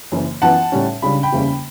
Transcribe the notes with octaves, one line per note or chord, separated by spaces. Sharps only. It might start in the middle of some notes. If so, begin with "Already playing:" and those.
F#1 F#2 E3
F#2 E3 B3 F#5 A5
A2 G3 C#4
C#2 C#3 G3 D4 B5
G5 B5
F#1 E2 C#3 G3 C#4